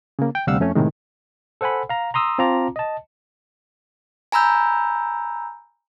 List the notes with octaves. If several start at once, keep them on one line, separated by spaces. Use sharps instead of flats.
C#3 A#3
G5
D2 C3 G3 F5 F#5 E6
F2 A3 C#4
A2 C3 D#3 G#3
A4 C5 F#5 G#5 B5
F5 A#5
A#5 C6 D#6 E6
C4 F4 A5 A#5 D6
D#5 A5
G#5 A#5 B5 E6 G6